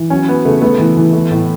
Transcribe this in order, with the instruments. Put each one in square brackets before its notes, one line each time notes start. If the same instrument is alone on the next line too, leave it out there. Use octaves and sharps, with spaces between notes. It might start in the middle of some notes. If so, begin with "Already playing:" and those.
Already playing: [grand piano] E3
[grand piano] F#3 [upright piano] C#4
[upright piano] B3 [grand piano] F#4
[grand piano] C#3 [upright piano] A3
[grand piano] A3 [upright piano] B3
[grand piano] E3
E3
A3
A2